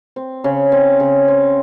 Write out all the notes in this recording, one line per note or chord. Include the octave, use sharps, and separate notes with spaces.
C4
C#3
C4
C#3
C4